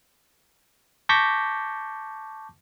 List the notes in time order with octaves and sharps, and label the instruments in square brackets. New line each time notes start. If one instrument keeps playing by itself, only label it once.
[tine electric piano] A5 C#6 D6 G6 A#6 B6